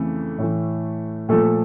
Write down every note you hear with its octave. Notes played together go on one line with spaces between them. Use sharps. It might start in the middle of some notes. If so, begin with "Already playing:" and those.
Already playing: F2 C#3 E3 A3
A2 E3
A#2 F3 A3 A4